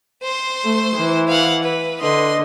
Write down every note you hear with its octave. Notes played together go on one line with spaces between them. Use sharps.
C5 C6
A3
E3
F5 F#5
B4
D3 B4 D#5 C6